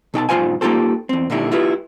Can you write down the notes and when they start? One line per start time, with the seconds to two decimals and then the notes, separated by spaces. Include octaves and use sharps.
0.14 B2 D#4 G5 A5
0.29 B1 G#2 F4 C5 F5 G#5
0.61 A#3 D#4 F4 G4 A4 C5
1.09 E2 C4
1.30 A#2 D3 D#4 E4 G4
1.52 E4 F4 G4 B4